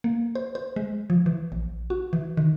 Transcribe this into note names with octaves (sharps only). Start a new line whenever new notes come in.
A#3
C5
C5
G#3
F3
E3
A#1
F#4
E3
D#3